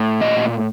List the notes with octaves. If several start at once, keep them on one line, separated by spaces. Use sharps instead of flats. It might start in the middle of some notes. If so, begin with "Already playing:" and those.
Already playing: A2
A#2 D#5